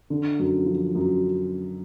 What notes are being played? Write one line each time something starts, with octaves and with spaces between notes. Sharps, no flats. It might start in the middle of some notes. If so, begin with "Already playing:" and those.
D3
F#2
F3
F#2